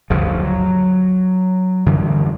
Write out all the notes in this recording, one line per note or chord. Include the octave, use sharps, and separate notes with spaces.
G1 D2 C#3 F3
F#3
F#2 D3 E3 G3